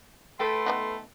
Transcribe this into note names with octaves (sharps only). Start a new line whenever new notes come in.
A3 A4 B4 G5 C6
B3 D#4 F#4